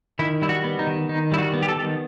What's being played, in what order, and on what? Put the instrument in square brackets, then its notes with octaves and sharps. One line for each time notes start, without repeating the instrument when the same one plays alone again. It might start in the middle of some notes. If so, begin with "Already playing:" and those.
[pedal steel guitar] D#3 E4
G3 E4
F#4
B3
D#4
D#3
D#3 D#4
G3 E4
F#4
B3
G4
A4
D#3